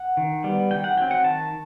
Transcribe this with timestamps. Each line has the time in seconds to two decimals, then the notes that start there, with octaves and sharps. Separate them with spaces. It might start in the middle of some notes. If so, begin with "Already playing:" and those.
Already playing: F#5
0.17 D#3
0.44 G3 B3
0.70 D#3 G5
0.84 F#5
0.97 F#3 C4 G5
1.11 F#5
1.24 D#3 A5